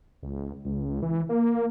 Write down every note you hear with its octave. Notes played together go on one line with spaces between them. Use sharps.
C#2
C#2
E3
A#3